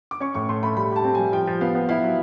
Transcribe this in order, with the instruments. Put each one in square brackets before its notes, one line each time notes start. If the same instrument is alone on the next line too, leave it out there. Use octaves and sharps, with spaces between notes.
[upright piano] D6
[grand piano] C#4 [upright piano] C#6
[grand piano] A2 [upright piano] C#6
[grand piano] A3 [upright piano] C6
[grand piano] A3 [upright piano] B5
[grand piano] G3 [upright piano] B5
[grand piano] G4 [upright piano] A5
[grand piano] C4
[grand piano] G3 [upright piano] G#5
[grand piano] F3 [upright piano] G5
[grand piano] F3
[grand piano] B3 [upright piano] F5
[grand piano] B3
[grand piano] E4 [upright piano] F5
[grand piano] F#3